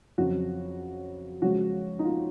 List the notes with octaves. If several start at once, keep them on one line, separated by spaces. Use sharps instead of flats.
F2 C#3 F#3 F#4
C#3 F3 G#3 F#4
D#4
F4